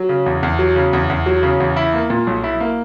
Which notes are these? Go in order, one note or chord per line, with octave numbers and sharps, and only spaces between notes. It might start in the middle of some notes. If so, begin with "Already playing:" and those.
Already playing: F#3
C#3
E2
E2
F#3
C#3
E2
E2
F#3
C#3
E2
E4
A#3
A#2
B1
E4
A#3